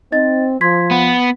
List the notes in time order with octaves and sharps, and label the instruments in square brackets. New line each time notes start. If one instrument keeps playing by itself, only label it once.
[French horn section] C4 [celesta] D#4 D#5 A6
[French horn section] F3 [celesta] C6 G#6 B6
[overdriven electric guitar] B3 [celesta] F#5